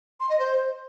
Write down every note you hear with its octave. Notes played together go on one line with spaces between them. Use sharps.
C6
D#5
C5